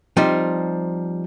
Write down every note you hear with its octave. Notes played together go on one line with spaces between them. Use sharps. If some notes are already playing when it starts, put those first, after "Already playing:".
F3 G3 C4 D#4